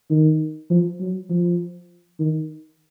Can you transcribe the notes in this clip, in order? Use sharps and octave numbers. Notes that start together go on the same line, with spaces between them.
D#3
F3
F#3
F3
D#3